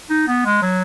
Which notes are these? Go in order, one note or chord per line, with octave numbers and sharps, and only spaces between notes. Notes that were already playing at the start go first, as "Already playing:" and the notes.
D#4
B3
G#3
F#3